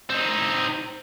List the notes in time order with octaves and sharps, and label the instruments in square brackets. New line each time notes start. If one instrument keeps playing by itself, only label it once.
[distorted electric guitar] C4 D#4